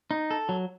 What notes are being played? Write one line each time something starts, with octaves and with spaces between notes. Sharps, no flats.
D#4
A4
F#3